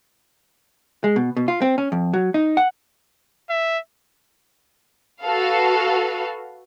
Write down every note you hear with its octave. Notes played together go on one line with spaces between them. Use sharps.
G#3
B2
B2
F4
C4
C#4
F2
F#3
D#4
F#5
E5
F#4 A4 B4 F5